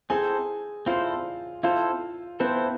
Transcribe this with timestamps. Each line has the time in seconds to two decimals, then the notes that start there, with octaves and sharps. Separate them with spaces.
0.10 C4 E4 G#4 A4 C5 G#5
0.86 C4 E4 F4 A4 C5 F5
1.63 C4 E4 F4 A4 C5 F5
2.40 B3 C4 E4 A4 B4 C5